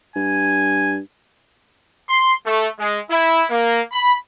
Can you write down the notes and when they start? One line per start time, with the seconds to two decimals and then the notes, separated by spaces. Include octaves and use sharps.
0.16 G2 G#5
2.08 C6
2.46 A3
2.79 G#3
3.10 E4
3.50 A#3
3.92 B5